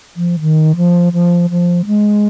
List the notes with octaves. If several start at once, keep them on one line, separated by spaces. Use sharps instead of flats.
F3
D#3
F3
F3
F3
G#3